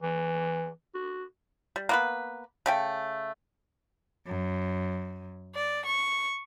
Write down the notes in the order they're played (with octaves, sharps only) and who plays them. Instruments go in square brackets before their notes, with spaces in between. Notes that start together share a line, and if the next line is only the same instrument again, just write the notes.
[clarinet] E3
F#4
[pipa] G3
A#3 B3 B4
C#3 A3 G5
[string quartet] F#2
D5
C#6